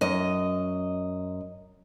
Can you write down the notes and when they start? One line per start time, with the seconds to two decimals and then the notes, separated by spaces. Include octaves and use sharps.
0.01 F#2 D#5